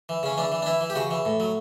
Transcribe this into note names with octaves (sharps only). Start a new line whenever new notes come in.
E3
C#3 C#4
E3 D4
E3
D4
E3 E4
E3
G4
C#3 F#4
E3
A2
F#3